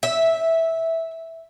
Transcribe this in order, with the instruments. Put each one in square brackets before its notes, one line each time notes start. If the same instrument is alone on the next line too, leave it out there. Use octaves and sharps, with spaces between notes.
[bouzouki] E5